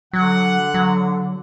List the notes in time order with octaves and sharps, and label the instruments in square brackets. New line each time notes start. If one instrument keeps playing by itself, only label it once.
[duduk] D3 [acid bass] F#3 [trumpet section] F#5
[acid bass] F#3